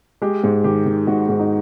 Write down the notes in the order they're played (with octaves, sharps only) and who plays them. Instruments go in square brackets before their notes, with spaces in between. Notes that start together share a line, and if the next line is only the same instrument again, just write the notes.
[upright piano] G#3 G4
G#2
D#3 G4
D#3
G#2 F#4
G#2
D#4